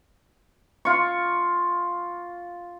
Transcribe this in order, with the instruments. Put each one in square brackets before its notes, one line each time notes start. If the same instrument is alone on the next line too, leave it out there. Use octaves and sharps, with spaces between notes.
[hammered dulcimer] F4 C#6